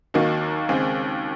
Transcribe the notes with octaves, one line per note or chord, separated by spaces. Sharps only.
D#2 D#3 A#3 D#4 F#4
D#2 C#3 G#3 C4